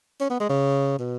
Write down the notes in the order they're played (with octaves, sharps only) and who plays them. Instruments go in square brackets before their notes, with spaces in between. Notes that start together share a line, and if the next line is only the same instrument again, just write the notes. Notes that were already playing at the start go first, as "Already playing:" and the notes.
[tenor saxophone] C#4
B3
G#3
C#3
B2